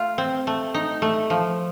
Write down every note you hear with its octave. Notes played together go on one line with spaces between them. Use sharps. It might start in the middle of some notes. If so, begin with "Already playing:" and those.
Already playing: A3 F4
C4
A3
D#4
A3
F3